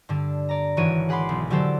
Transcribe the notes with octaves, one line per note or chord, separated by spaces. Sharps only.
G2 D3 D4
D5 A#5
G#1 E3 F#4 C#5 D7 D#7
G#4 F#5 B5 C6 D6
B1
D3 F#3 F#4 G4 A4 C5